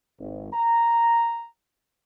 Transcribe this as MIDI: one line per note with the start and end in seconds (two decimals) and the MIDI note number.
0.19 0.51 32
0.53 1.45 82